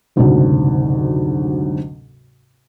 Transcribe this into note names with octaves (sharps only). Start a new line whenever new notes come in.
F#1 D2 G#2 C3 F#3